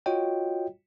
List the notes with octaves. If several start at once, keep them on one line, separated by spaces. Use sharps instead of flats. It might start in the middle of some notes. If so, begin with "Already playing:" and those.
F4 F#4 C#5 D#5 G5